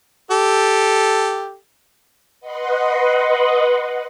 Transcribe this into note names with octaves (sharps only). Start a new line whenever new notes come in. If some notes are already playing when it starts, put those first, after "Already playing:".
G4 A4
B4 D#5 F#5 C6